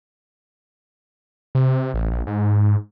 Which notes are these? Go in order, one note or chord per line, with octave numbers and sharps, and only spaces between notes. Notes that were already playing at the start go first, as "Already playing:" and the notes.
C3
A1
A#1
G#2